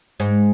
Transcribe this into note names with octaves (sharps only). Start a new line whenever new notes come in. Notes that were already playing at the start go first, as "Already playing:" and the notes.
G#2 G#3